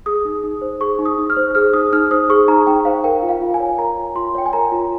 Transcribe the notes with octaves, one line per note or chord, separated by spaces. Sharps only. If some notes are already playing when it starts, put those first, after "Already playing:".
G#4 D#6
D#4
D#4
C5
G#4 C#6
D#4
D#6
D#4
F6
C5
G#4 F6
D#4 D#6
D#4 F6
C5 D#6
G#4 C#6
D#4 A#5
D#4 G5
C5 F5
A#4 G5
F4
F5
F4
G#5
C#5
A#4 A#5
F4
F4 C6
C#5 G5
G#5
A#4 A#5
F4